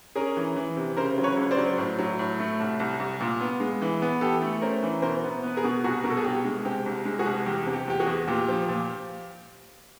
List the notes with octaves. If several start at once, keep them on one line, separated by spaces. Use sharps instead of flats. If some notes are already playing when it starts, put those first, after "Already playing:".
C#4 G#4 A#4
E3
E3
C3
C#3 A#4 C5
F#3
B4 C#5
C#2
C5 D5
F#3
A2
F#3
A2
A3
C2
C2
C2
A#2
B3
G#3
E3
B3
E3 G4 A4
A3
C#4 A#4 C5
E3
B2 A#4 C5
B3
B3 B4
G#4 A#4
B2
C2 F#4 G#4
B2 A#4
A4
G#4
C2 G4
G#3
C3 G4
C2
G#3
F#4 G#4
C2
E2 G4
C3
G4
E2 G4
F#4 G#4
E2
A#2 G4
F3
A#2